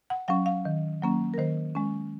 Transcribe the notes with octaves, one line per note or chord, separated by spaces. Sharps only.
F#5
F#3 C#4 F5
F5
D#3
F#3 A#3 C#4
A#4
D#3 C5
G#3 C#4